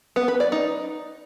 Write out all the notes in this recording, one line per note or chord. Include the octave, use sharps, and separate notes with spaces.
B3
B4
D5
D#4